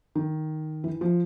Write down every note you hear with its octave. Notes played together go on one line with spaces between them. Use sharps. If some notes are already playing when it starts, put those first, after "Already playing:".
D#3
E3
F3